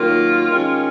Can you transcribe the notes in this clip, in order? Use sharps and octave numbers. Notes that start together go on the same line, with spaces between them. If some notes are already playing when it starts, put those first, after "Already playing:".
Already playing: D#3 F#3 A#3 F4
D#3 G#3 C#4